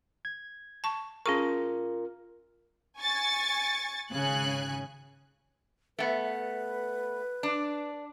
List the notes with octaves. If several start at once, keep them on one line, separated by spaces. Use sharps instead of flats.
G#6
A5 C#6
C#4 F4 G#4 A#4 C#6
G#5 C#6 A6 C#7
G#1 C#3 G#5 F#6
A3 B3 B4
D4